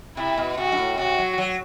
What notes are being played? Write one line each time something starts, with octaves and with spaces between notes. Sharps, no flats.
C3 E4
B2
C3 F#4
G2
A2
C3 F#4
F#3
F#3